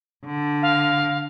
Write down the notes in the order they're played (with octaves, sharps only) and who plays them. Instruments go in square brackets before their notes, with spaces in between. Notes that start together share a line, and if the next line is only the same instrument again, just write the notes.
[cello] D3
[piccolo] F5